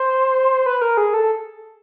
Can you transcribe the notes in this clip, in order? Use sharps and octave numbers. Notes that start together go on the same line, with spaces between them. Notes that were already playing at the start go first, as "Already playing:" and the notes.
Already playing: C5
B4
A#4
G#4
A4